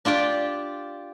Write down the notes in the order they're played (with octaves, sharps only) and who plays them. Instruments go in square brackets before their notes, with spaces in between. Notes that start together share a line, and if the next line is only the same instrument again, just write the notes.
[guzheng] D4 F4 G4 D5